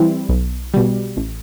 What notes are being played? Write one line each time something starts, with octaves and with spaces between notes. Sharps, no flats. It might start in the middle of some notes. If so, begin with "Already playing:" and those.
Already playing: E3 G3 C4 E4
B1
B2 G3
A1